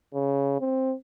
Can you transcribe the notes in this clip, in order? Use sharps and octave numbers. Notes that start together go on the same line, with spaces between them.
C#3
C4